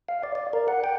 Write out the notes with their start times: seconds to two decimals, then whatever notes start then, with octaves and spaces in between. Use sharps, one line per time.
0.09 F5
0.23 D5
0.35 D5
0.53 A#4
0.68 F#5
0.84 G5